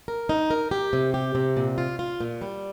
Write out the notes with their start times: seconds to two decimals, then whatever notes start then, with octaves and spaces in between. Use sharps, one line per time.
0.08 A#4
0.29 D#4
0.50 A#4
0.71 G4
0.93 C3
1.14 G4
1.35 C3
1.57 A#2
1.78 F4
1.99 F4
2.21 A#2
2.42 G3